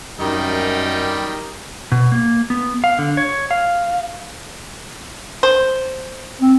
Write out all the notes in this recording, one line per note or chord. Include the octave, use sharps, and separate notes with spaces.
F#2 D#3 G3 D#4
B2
A#3
B3
F5
D3
C#5
F5
C5
C4